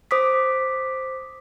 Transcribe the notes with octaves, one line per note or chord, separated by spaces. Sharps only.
C5 D6 D#6 B6